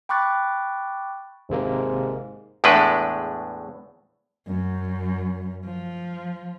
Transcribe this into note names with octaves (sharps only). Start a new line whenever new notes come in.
G5 B5 C#6 D6 F#6 A6
G#1 G#2 C3 A#3
E2 A2 G#3 A3 D4 B4
F#2
F3